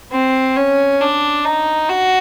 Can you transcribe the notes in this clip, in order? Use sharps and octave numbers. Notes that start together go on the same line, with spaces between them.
C4
C#4
D4
D#4
F#4